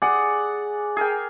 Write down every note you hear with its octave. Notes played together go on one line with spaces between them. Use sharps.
G#4 D5 F#5
G#4 A#4 G5